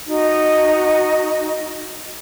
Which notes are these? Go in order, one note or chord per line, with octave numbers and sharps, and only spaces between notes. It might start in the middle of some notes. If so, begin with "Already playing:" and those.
D#4 F#4 D#5